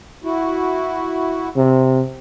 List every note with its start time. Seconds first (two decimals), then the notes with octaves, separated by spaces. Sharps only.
0.24 E4 F#4
1.56 C3